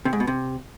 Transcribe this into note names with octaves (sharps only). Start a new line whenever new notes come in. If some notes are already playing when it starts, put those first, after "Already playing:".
C3
G#2
B2
C3